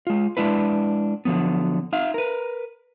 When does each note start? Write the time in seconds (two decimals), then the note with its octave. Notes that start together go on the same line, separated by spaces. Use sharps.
0.07 G#3 F4
0.37 G#3 D4 E4 B4
1.25 D3 F3 F#3 B3
1.93 D#4 E5 F5
2.14 A#4 B4